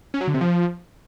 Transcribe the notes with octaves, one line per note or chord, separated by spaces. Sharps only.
C#4
F#3
D3
C3
F3